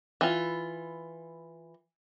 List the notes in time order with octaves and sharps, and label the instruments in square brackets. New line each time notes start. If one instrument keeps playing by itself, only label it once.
[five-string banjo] E3 F4